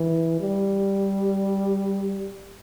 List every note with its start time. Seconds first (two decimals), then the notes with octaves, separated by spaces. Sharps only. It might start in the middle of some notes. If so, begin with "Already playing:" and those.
Already playing: E3
0.40 G3